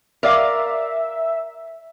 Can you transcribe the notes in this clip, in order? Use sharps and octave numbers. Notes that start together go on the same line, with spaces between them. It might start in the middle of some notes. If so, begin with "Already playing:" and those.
A#4 D5 E5 F5